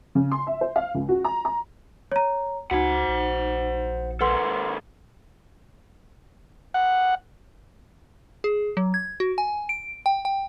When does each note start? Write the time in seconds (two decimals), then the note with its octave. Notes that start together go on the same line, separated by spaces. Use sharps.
0.15 C#3
0.32 C6
0.47 E5
0.61 C5
0.76 F5
0.95 C#2
1.09 F#4
1.24 A#5
1.45 A#5
2.12 C#5 A#5
2.71 C#2 D#4 F#4 C5 F#5
3.08 A#1
4.21 D#2 A4 B4 F#5 C6
6.74 F#5
8.44 G#4
8.77 F#3
8.94 G#6
9.20 F#4
9.38 G#5
9.69 D7
10.06 G5
10.25 G5